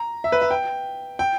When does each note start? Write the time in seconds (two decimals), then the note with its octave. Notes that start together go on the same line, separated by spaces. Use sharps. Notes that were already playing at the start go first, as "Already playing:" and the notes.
Already playing: A#5
0.24 E5
0.32 B4
0.42 E5
0.51 G5
1.19 G5